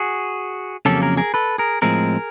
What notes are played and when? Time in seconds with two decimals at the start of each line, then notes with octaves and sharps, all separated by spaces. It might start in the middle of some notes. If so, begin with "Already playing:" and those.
Already playing: F#4 G#4
0.85 F2 C#3 F#3 A#3 C#4 G4 A4
1.02 G#4 A#4
1.17 G#4 A#4
1.34 A4 B4
1.58 G#4 A#4
1.82 A2 F3 G#3 C4 G#4 A#4